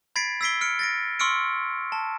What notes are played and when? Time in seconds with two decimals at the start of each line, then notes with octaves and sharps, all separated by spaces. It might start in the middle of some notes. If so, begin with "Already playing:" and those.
0.16 B5 G#6 A6 B6 C7 D7
0.41 E6 G#6 B6 C7 D7 G7
0.61 F6 C#7 D7
0.79 A6 A#6 D7
1.19 C6 C#6 E6 F6 C#7 D7
1.92 A5